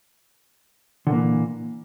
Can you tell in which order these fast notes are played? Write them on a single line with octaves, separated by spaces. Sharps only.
D3 A#2 A#3 E3